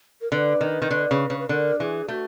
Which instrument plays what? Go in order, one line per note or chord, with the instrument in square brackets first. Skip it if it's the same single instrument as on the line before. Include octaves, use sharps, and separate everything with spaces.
[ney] A#4
[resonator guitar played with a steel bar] D3 [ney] B4
[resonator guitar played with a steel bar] D#3
D#3
D3
C#3
C#3
[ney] B4
[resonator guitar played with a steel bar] D3 [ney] A#4
[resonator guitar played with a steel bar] E3 [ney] G#4
[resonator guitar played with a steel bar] A3 [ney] F#4